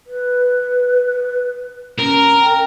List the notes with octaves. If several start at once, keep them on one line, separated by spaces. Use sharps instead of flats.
B4
C#4 A#4
G5